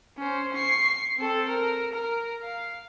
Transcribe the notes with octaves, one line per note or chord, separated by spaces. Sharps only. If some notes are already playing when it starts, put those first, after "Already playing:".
C#4 C5
C#6 C7
C4 A4
A#4
A#4
F5